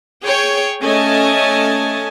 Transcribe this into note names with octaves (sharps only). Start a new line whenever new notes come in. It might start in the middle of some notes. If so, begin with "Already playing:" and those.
G#4 C#5 G5
A3 C#4 D#5 G#5 A5